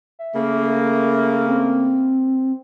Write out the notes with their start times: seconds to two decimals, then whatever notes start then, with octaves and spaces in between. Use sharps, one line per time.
0.19 E5
0.35 C#3 A3 A#3
1.48 C4